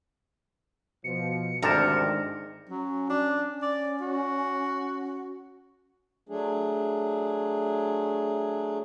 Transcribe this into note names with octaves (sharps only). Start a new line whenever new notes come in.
B2 F3 C#7
D2 G#2 C3 D#3 D4 A#4 A5
F#3 C#4
D4
C#4
D5
F#4
F#3 A3 D4 G#4